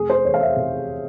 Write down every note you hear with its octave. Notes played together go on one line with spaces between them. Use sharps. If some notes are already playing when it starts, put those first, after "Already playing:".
Already playing: F1 G#4
C5
E2 C#5
F5
E5
C3